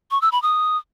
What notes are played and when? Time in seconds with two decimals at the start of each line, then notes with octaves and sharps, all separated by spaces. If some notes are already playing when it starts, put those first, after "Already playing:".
0.11 C#6
0.22 E6
0.32 B5
0.42 D#6